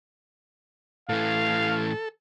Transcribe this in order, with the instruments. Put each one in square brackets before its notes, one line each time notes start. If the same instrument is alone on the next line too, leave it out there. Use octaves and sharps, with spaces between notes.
[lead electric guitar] A2 E3 [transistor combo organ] A4 [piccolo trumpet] F5